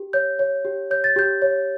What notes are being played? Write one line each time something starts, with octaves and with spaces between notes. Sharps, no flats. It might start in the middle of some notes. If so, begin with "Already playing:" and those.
Already playing: G4
C#5 G6
C#5
G4
C#5 G6
A6
G4 G6
C#5